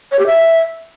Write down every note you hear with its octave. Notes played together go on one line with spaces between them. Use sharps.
C#5
G4
E5